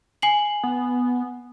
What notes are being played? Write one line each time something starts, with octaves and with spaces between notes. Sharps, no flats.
G#5 C7 F#7
B3